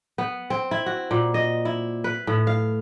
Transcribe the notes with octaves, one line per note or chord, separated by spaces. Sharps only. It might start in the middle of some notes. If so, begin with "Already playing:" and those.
B3
C4
E4
F#4
A#2
D#5
E4
B4
A2
F5